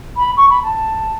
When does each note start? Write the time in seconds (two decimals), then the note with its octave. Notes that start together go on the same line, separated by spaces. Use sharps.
0.17 B5
0.37 C#6
0.50 B5
0.63 A5